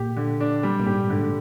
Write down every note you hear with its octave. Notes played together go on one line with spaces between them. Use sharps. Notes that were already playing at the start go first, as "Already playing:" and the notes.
Already playing: A#2 G4
D3
D4
G3
A#2
G#2 G4
G#2 D3
A#2